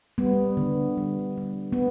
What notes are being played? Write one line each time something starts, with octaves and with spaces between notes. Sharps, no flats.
G3 B3
D3
G3
G3
B3